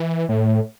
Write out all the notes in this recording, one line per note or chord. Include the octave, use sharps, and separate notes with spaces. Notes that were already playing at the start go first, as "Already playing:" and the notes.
Already playing: E3
A2